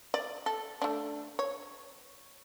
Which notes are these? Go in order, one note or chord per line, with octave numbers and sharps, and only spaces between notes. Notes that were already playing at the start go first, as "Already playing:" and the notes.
D5
A4
A3 D4
C#5